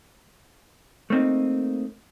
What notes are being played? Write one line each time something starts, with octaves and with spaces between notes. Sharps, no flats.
A3 A#3 C4 D#4